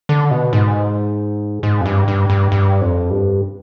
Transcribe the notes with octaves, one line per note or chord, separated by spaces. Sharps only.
D3
B2
G#2
G#2
F2
G2
G2
G2
G2
F2
G2